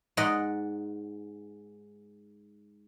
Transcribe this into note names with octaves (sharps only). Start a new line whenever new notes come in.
G#2 D5 D#5 F#5